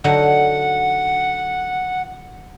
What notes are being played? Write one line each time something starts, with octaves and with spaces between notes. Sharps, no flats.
D3 F#3 D#4 F#5